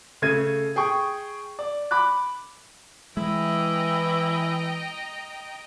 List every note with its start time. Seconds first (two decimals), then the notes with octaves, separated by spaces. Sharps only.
0.22 C#3 A3 G#6 D#7
0.76 G#4 G5 C#6
1.59 D5
1.91 B5 D6 F#6
3.17 E3 G#3 E4 D#5 G5 A#5